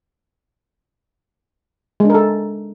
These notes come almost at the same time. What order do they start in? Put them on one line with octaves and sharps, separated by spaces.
G#3 D4 A#4 A4